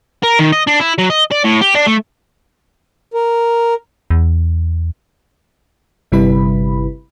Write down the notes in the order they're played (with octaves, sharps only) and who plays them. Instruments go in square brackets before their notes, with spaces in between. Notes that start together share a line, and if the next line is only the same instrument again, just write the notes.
[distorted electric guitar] A#4
D#3
D#5
D4
E4
F#3
D#5
D5
A2
G4
D4
A3
[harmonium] A#4
[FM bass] E2
[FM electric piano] G1 C3 G3 E4 B4 B5